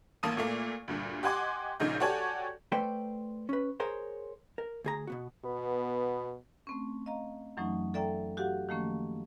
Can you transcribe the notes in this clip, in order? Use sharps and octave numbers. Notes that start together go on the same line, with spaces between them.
A1 A#3 A5 D#6 D#7
A#2 A3 A#3
D2 G2 A#2
G4 D#5 F#5 G#5 C6 D6
A#1 A#2 C#3 D#4 G6
F#4 G4 A4 C#5 D5 G#5
A3 A4 B4 C5 D5 G5
C#4 B4
G#4 A#4 C5 C#5
A#4
D2 G#4 A#5
B2 B3 F#4
B2 B3
A3 C4 C#4
D#5 F5 A#5
F#2 E3 F#3 A3 C#4 D#4
A4 D5 E5 G5 A#5
F#4 G4 A4 F5 F#5
D#3 F3 A3 A#3 C#4